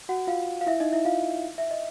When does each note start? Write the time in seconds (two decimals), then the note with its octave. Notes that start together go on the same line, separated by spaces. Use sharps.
0.09 F#4 F#5
0.27 F4 F5
0.61 F5
0.67 E4 E5
0.80 D#4 D#5
0.92 E4 E5
1.05 F4 F5
1.58 E5
1.71 D#5